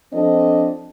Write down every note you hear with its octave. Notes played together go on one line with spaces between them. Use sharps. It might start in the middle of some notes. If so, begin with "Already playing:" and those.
F3 C4 D4 A4 D#5